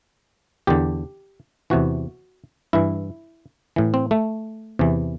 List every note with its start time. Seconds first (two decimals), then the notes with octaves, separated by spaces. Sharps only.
0.67 E2 D3 G4
1.70 E2 C3 E3 F#4
2.73 G2 E3 E4
3.76 A2 E3
3.94 C4
4.11 A3
4.79 E2 C3 E3